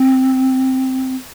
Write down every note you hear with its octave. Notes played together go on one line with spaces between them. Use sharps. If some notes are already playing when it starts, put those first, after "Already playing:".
Already playing: C4